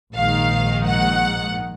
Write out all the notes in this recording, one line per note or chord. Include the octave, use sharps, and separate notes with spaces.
A#1 G#2 D#3 F5
F#5